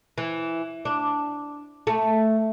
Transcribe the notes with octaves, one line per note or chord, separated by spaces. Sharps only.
E3
D4
A3